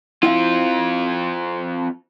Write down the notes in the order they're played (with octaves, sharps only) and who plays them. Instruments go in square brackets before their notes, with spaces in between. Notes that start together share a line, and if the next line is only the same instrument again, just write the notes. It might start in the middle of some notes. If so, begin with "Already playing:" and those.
[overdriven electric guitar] C4 F4 [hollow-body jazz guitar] E4 F5